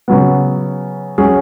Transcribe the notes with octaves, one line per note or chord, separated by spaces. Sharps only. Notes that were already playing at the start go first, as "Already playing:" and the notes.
C#3 F#3 B3
F#3 C#4 G#4